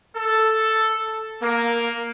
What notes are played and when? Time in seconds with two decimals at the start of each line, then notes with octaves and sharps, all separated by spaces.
0.16 A4
1.41 A#3